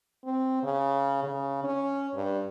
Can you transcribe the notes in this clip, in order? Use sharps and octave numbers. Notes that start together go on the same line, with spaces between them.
C4
C#3
C#3
C#4
G2